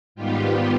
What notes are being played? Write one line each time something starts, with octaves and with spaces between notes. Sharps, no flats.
G#2 D#3 G3 B3 F4 G4